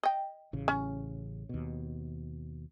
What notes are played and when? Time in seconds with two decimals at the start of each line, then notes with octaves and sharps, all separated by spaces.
0.03 D#5 G5
0.53 A1 C#3
0.68 C#4
1.49 D#2 B2